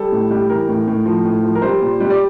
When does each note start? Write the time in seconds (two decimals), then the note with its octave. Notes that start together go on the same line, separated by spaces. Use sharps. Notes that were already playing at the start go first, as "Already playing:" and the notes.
Already playing: G3 A4
0.12 A2
0.31 G3
0.49 E3 A#4
0.69 A2
0.87 A2
1.06 F3
1.25 A2
1.43 F3
1.55 A#4
1.62 G3 C5
1.82 A#2
2.00 G3
2.10 D5